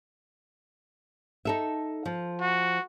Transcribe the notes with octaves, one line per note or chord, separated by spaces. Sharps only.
D#4 A4 E5
F3
F#4